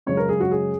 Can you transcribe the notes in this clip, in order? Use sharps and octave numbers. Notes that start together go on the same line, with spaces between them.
F#2 C#3 G#3 C#4 C#5
A#4
G#4
F#4
G#4